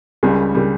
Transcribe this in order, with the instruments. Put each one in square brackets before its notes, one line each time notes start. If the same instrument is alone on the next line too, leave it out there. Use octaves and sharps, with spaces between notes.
[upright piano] C#2 C#3 G3
C#3 G3